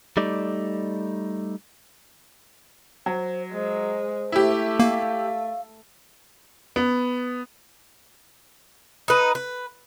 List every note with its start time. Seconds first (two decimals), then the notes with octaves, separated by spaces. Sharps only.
0.17 G3 A3 D#4 D5
3.06 F#3 C5
3.53 G#3 C5
4.32 A3 E4 G4
4.79 A#3 F5
6.76 B3
9.08 D#4 B4
9.35 B4